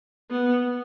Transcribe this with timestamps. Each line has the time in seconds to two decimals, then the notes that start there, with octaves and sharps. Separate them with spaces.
0.31 B3